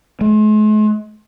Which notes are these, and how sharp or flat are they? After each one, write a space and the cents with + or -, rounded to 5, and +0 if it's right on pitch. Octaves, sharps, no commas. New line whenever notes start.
G#3 +45